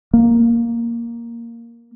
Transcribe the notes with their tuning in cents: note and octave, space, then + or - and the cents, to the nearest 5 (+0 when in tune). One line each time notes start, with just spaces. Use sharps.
A#3 +0